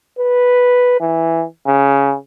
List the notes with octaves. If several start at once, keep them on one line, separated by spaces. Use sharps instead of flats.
B4
E3
C#3